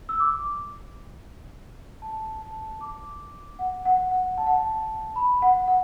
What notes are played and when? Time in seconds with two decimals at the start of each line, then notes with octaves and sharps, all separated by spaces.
0.09 E6
0.20 D6
2.02 A5
2.42 A5
2.81 D6
3.59 F#5
3.85 F#5
4.11 F#5
4.38 A5
4.47 F#5
4.56 A5
5.16 B5
5.42 F#5
5.68 F#5